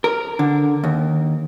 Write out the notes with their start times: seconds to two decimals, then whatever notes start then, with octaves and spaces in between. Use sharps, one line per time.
0.04 A#4
0.39 D3
0.84 D#2